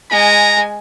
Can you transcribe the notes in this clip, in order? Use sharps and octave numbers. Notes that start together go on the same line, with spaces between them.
G#3 G#5 A#5